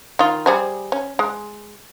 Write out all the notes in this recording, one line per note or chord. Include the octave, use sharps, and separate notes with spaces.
D#3 F4
G3 G#4 C5
C#4
G#3